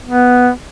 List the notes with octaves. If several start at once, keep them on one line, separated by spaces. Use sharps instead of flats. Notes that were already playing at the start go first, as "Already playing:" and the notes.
B3